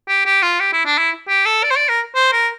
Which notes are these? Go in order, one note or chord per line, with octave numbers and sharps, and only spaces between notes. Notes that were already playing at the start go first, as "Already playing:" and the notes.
G4
G4
F4
G4
E4
D4
E4
G4
A4
D5
C5
D5
A#4
C5
A#4